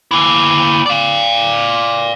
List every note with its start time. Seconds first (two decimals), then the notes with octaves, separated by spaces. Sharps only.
0.11 A#3 E4
0.86 D5 F5